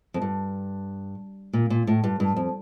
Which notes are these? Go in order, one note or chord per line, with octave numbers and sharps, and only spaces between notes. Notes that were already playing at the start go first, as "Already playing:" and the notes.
F2
G2
A#2
A#2
A2
G2
G2
F2